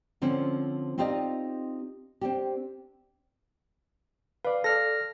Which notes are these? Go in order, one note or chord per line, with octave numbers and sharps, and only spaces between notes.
D3 F3 C4 C#4
C4 D#4 F4 G4 D5 D#5
C4 D4 G4
B4 D5 F5
A4 D5 F6 A#6